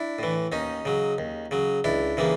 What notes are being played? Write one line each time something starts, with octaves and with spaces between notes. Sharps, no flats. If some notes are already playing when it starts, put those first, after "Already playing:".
Already playing: D4 E4
A2 E3
D#2 C#4 D#4
C#3 F#3
D#2
C#3 F#3
C#2 D4 E4
C#3 E3 G3 A#3